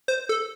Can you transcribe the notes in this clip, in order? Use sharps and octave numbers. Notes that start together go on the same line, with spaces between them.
C5
A4